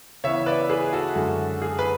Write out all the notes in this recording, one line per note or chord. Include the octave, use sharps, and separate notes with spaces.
C#3 E3 B3 C#5 E5
B4 D5
G#4 B4
F#4 A4
F#2 D3 G#3
G#4
B4